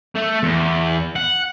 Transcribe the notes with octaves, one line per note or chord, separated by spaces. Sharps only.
A3
E2
F#5